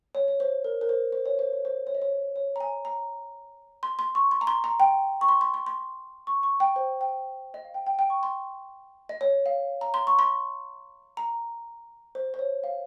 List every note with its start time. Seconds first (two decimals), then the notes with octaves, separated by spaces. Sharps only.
0.15 C#5
0.28 C#5
0.40 C5
0.64 A#4
0.81 A#4
0.89 C5
1.12 C5
1.26 C#5
1.39 C5
1.53 C#5
1.65 C5
1.87 C#5
1.95 D#5
2.02 C#5
2.36 C#5
2.56 A#5
2.60 G#5
2.85 A#5
3.83 C6
3.99 C6
4.15 C#6
4.31 C6
4.41 A#5
4.47 C6
4.64 A#5
4.80 G5
5.21 C#6
5.29 C6
5.41 C6
5.54 C6
5.66 C6
6.27 C#6
6.43 C#6
6.60 G5
6.76 C5
7.01 G5
7.54 D#5
7.65 F5
7.74 G5
7.87 G5
7.99 G5
8.10 C#6
8.23 C6
9.09 D#5
9.21 C#5
9.46 F5
9.81 A#5
9.94 C6
10.07 C#6
10.19 C6
11.17 A#5
12.15 C5
12.34 C5
12.39 C#5
12.64 F5